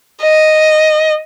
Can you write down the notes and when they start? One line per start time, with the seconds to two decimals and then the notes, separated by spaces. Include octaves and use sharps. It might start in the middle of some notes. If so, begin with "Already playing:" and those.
0.22 D#5